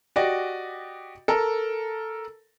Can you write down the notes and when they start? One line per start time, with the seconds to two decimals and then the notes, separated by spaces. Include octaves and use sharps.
0.16 F#4 G4 D5 D#5
1.28 A4 A#4